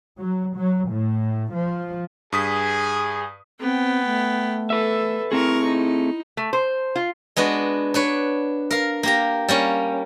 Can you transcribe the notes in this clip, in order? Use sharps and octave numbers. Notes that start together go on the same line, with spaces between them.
F#3
F#3
A2
F3
G2 G#4 D#6 B6
B3 C4 G5
A3
A4 B4 E5
A3 C4 E4 G#4 A#4 C#6
D#4
A3
C5
F4
G#3 B3 D4 F#4
D4 B4 C#5
A#4 F5
A#3 G4 A#5
G3 A#3 C#4